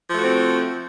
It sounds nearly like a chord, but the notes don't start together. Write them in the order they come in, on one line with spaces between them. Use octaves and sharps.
F3 A3 F#4 C4